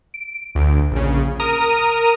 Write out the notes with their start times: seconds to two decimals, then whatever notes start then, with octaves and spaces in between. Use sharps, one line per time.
0.14 D7
0.55 D2
0.91 A#1 C#3
1.40 A#4 A#5 D#6 D#7